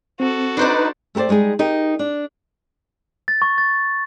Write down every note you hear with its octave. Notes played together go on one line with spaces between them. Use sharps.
C4 F#4 A4
D4 D#4 B4 C5 D5
A3 G4 A#4 C5 D5
G3 G#3 D#4 G#4
D#4 G4 A#4
D4
A6
C#6
A6